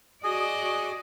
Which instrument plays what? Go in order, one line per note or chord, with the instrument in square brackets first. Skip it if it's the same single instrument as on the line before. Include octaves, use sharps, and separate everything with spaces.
[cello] F#4 D5 [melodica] G#4 G#5 [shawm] D#5